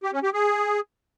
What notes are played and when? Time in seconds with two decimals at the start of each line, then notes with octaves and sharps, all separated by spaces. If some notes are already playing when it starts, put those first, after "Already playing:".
0.03 G4
0.13 C#4
0.23 G4
0.33 G#4